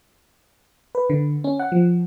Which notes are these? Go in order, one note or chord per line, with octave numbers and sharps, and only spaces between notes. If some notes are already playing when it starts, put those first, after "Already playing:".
B4
D3
C#4
F#5
F3